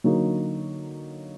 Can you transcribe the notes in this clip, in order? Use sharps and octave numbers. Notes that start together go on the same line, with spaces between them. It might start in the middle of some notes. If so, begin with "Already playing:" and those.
D3 F#3 A#3 D#4